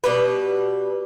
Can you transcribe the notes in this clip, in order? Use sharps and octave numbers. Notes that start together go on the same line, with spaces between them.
B2 G3 B4